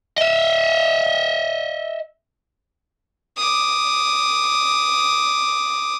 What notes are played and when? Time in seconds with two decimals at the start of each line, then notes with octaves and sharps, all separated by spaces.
0.18 D#5 E5
3.37 D6 D#6